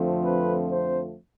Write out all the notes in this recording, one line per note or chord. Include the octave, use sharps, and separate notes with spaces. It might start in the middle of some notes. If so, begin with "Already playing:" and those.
Already playing: F2 D3 F3 A3 C4
B4
C5